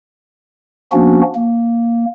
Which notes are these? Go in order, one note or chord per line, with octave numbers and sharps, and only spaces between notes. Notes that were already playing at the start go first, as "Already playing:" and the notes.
F3 A#3 B3 C#4 D4 F#4
A#3